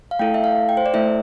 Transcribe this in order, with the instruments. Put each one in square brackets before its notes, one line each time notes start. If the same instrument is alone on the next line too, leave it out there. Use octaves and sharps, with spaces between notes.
[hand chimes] F5
A3 E4 A4 G5
E5
F5
G5
C5
D5
A3 E4 A4 E5